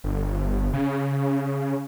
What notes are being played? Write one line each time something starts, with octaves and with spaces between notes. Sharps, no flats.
G1
C#3